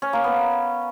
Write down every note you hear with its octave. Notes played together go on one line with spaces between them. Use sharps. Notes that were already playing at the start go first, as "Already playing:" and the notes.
C#4
A#3
B3